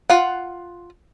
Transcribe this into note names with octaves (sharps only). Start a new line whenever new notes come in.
F4 F#5